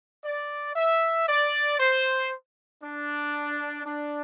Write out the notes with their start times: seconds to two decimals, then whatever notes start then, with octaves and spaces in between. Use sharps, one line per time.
0.23 D5
0.75 E5
1.28 D5
1.78 C5
2.82 D4
3.85 D4